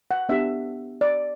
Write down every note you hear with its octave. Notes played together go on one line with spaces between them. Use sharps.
F#5
B3 D4 G4 E5
D5